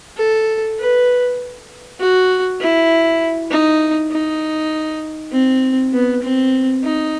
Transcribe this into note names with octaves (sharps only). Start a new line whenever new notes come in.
A4
B4
F#4
E4
D#4
D#4
C4
B3
C4
D#4